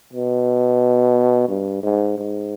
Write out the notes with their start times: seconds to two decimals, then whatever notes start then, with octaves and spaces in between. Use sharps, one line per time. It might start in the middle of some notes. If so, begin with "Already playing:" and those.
0.13 B2
1.49 G2
1.83 G#2
2.18 G#2